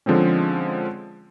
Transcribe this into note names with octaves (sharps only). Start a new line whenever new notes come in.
D3 F3 G#3 C4 C#4